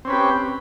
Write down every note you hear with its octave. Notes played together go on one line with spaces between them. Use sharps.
C4 C#4 G4 B4